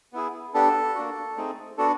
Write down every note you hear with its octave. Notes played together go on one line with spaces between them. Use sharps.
B3 E4 G#4
B3 D4 G4 A4
A#3 D4 F#4
A3 C4 D#4 G#4
B3 D4 F#4 A4